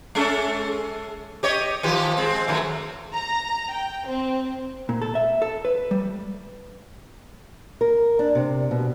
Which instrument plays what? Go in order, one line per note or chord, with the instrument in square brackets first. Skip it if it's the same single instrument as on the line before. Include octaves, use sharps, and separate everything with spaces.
[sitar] G#3 C#4 A4
G4 C#5 D#5
D#3 F3 G4
G#3 C4
D#3 F#3 A3
[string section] A#5
G5
C4
[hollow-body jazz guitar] A#2
A4
E5
A4
B4
G3
[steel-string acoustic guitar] A#4
D4
C3
B2